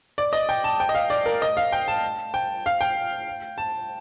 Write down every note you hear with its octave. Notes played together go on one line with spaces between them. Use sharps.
D5
D#5
G5
A5
G5
D#5
F5
D5
A#4
D#5
F5
G5
A5
G5
F5
G5
A5